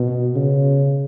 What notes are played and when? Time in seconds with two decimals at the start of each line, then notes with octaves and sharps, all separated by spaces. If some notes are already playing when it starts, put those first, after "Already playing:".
Already playing: B2
0.36 C#3